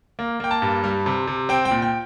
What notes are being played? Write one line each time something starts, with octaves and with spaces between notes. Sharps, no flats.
A#3
A#3 G5
A5
G2
G3
C3
C3
C4 G5
G5
A#2
G5